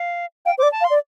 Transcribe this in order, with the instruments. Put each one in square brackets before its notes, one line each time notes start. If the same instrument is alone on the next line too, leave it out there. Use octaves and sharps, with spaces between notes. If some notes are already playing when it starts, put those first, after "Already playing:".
Already playing: [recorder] F5
[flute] F5 [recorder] G5
[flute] C5 D5 [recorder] D6
[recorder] A5
[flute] F5
[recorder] C6
[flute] D5